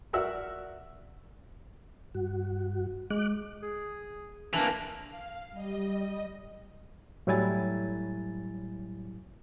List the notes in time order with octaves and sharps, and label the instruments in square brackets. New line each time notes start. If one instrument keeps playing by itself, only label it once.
[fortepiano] F#4 A#4 D5 E5 F#5 E6
[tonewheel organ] G2 F#4
[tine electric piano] G#3 [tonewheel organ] D6 F#6
[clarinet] G#4
[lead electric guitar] E3 A#3 [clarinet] D4
[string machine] F5
G3 D#5
[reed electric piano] A2 F#3 G3 E4 G#5 A6